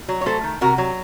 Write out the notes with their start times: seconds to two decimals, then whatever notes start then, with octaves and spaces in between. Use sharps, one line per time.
0.09 F#3
0.21 C#5
0.26 A3 A4 C5
0.43 D#3
0.61 C3 F#4 A#4
0.78 F#3